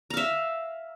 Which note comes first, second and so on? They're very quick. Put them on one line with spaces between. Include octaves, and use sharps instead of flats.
A#5 F5 E5